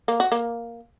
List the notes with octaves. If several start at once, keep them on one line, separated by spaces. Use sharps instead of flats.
A#3
F#4
A#3